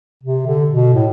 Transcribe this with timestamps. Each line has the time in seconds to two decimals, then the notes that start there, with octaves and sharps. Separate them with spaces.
0.23 C3
0.47 D3
0.70 B2
0.94 A2